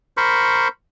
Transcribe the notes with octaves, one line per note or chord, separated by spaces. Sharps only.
A#4 C5 B5 C#6